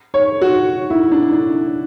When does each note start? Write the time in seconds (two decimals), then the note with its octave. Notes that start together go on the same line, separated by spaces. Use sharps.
0.14 C#5
0.41 F#4
0.90 E4
1.11 D4
1.32 D4